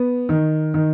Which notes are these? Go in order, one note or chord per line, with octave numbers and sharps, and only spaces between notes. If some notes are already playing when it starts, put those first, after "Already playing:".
Already playing: B3
D#3
D#3